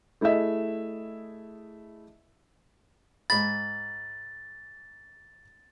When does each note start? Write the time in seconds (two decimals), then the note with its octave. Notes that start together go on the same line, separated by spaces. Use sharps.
0.21 A3 E4 G#4 D#5 E5
3.30 G#2 B5 A6